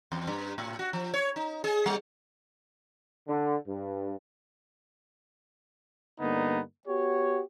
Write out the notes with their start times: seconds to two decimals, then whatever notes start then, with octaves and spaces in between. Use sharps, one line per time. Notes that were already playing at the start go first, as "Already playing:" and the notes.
0.12 E2
0.27 G2
0.58 A2
0.79 F#4
0.93 F3
1.14 C#5
1.36 D#4
1.64 G#4
1.86 G3
3.28 D3
3.67 G2
6.20 G2 D3 A#3 B3 D#4
6.87 B3 F#4 G4 C#5